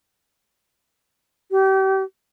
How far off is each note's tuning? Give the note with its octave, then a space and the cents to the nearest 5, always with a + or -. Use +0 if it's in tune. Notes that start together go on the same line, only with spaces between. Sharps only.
G4 -35